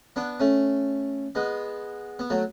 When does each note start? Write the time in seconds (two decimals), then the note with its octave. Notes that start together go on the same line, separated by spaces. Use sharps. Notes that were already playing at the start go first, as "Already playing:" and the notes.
0.16 B3 D4
0.40 A3 C#4
1.35 G#3 B3
2.19 B3
2.30 F#3 A3